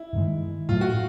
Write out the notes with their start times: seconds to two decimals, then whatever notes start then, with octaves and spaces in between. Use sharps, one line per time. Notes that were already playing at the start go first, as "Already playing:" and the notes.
Already playing: E4
0.13 G2 D#3 G#3
0.69 A2 F#3 A3 F4
0.81 F#4